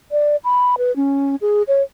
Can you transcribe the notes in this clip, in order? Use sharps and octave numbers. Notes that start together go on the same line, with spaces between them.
D5
B5
B4
C#4
G#4
C#5